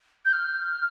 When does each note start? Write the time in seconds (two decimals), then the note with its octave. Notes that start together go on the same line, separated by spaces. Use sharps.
0.25 G6
0.32 F6